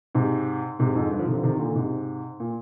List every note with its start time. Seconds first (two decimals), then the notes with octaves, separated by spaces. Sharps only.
0.15 G#2 C3
0.79 G#2 C3
0.95 F2 G#2
1.11 G2
1.19 D3 F3
1.27 C3 D#3
1.35 D3 F3
1.43 C3 D#3
1.59 A#2 D3
1.75 G#2 C3
2.40 A#2